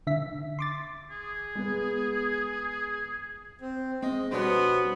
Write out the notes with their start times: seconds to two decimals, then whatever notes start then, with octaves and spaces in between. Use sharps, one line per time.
0.07 D3 E5 B6
0.59 C6 D6 A6
1.11 G#4
1.55 G#3 B3
3.61 C4
4.03 G#3 C4 D#5
4.31 B2 G3 B3 C#4 D4 C5 D5